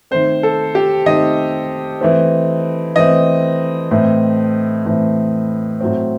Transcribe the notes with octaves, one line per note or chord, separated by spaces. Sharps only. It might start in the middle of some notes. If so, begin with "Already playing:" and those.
D#3 A3 C4 C5
A4
G4
D#3 A3 C4 D#5
E3 A3 C4
E3 A3 C4 D#5
A2 E3 A3 C4
A2 E3 A3 C4
A2 F#3 A3 C4